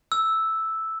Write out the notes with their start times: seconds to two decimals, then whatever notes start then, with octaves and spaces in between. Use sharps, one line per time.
0.12 E6